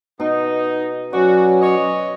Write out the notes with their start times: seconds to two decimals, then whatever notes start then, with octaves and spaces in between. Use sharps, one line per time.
0.20 B2 D#4
1.13 F#3 C#4 F#4 D5
1.61 C#5 D#5